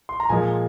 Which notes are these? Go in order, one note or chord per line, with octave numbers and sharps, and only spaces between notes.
C6
A#5
A#2 F3 G#3 G#5